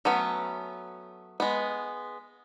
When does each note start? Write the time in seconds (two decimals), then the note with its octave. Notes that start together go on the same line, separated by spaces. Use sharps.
0.05 F#3 A3 B3 C#4
1.40 G#3 B3